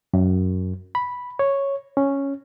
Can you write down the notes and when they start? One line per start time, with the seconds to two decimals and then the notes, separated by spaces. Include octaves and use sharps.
0.14 F#2
0.95 B5
1.39 C#5
1.97 C#4